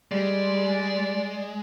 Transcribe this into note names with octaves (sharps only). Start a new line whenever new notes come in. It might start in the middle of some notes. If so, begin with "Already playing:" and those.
G3 G#3 D5